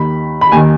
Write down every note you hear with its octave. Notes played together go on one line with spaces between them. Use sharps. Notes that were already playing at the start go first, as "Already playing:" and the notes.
Already playing: D#2 D#3 B5
B5
D#2 D#3 G#5